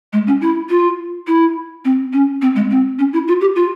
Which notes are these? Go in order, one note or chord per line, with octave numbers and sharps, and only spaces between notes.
G#3
C#4
E4
F4
E4
C4
C#4
C4
G#3
C4
C#4
E4
F4
G4
F4